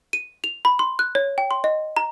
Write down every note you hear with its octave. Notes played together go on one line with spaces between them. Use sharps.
D#7
F7
B5
C6
F#6
C#5
G5
C6
D#5
A#5